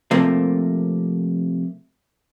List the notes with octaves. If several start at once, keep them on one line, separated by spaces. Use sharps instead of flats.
C3 F3 A3 A#3